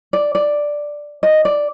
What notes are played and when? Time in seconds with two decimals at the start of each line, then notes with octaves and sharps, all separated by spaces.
0.13 D5
0.35 D5
1.23 D#5
1.45 D5